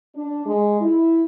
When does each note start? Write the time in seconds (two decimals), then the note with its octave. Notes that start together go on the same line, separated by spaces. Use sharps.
0.15 D4
0.46 G#3
0.81 E4